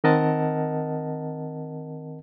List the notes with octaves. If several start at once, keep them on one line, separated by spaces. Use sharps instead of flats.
D#3 C4 A#4 D#5 F#5 A5